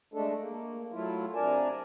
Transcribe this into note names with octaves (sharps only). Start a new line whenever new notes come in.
G#3 A3 D4 A4
A#3
F#3 A3 E4 F4
C3 D4 A#4 D5 G#5 A5